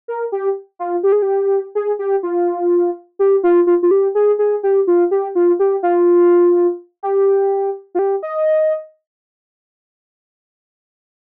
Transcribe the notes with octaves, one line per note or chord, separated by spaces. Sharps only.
A#4
G4
F4
G4
G#4
G4
G#4
G4
F4
G4
F4
F4
F4
G4
G#4
G#4
G4
F4
G4
F4
G4
F4
G4
F4
G4
D#5